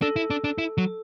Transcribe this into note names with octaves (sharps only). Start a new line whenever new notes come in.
D4 A4
E4
D4
D4
E4
F#3